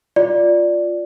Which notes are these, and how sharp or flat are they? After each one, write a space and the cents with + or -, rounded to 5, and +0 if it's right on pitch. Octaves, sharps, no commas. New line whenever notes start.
F4 +5 D5 +0